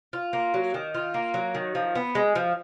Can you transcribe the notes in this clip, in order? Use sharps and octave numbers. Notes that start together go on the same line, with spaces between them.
F4
A#3
F#3
D#3
F4
A#3
F#3
D#3
F3
B3
G#3
F3